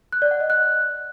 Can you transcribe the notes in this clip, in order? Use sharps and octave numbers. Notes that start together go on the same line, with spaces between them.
F#6
D5
F#5
D#5
F#6